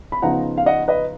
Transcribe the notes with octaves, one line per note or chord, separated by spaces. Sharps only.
B5
C#3 F3 B3 D#4 F#5 A#5
F5
D#5 F#5
B4 D#5